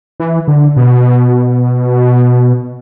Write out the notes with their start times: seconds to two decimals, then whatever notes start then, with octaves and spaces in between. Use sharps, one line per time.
0.20 E3
0.48 D3
0.76 B2